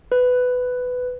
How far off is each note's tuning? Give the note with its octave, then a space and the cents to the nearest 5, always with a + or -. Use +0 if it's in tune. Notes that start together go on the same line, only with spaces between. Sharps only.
B4 +15